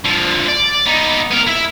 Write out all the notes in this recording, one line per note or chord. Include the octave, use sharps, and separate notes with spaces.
D3 F3
D5
B3 D#4
B3 A#4
E4 E5